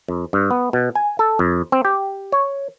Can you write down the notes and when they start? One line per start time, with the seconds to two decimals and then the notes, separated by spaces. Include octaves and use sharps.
0.08 F2
0.33 G2
0.51 B3
0.73 B2
0.95 G#5
1.19 A4
1.39 F2
1.72 C4
1.85 G4
2.32 C#5